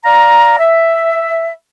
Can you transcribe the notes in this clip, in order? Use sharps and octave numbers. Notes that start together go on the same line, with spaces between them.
D5 F5 A#5
E5